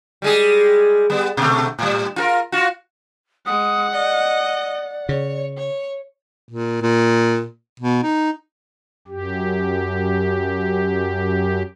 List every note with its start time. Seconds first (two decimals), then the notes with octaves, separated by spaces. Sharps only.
0.22 G3 G#3 G#4
1.10 G3 B3
1.37 B2 A3
1.79 A2 G3
2.16 F4 F#4 A#4
2.52 F4 F#4
3.46 G#3 F#5 D#6
3.93 D5 D#5
5.09 C#3 C#5
5.57 C#5
6.49 A#2
6.82 A#2
7.80 B2
8.03 D#4
9.08 F#2 G4